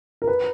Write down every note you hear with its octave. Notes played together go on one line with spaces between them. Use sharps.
A#4
B4